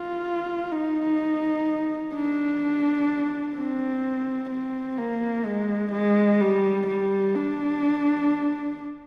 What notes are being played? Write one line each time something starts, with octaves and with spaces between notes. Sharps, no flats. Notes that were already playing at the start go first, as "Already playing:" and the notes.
Already playing: F4
D#4
D4
C4
C4
A#3
G#3
G#3
G3
G3
D4